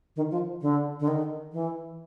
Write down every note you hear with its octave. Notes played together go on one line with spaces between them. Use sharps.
D#3
F3
D3
D3
D#3
E3